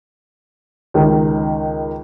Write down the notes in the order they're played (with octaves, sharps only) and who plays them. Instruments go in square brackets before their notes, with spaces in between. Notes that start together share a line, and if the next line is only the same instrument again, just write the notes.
[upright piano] C#2 D#3